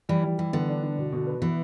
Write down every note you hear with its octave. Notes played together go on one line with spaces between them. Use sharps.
E3 G3
G3
E3 G3
D3 B3
D4
D4
B2
B2
B4
E3 B3